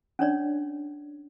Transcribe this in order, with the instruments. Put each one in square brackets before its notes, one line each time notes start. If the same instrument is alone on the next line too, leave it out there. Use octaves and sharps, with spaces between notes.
[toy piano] C#4 D4 C#5 D5